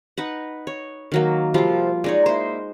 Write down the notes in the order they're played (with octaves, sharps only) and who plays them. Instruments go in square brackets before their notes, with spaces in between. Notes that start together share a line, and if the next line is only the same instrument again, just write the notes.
[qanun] D#4 B4 F#5
C#5
D#3 F#3 A#3
[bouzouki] C3 A4 C5 [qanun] F3 G3 F4
[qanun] G#3 D#4 C#5 [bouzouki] D5
[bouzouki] A#3 E4 [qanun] C5